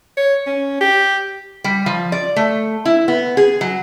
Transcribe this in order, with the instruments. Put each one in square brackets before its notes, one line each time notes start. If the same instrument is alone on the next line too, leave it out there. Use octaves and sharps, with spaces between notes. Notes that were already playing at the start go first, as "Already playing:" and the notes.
[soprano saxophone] C#5
C#4
G4
[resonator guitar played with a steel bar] G3
F3
D5
A3
E4
B3
G#4
F#3